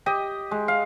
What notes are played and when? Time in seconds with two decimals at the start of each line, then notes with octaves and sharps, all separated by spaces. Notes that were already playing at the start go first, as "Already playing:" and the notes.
0.06 G4 D#5
0.51 G#3
0.68 F5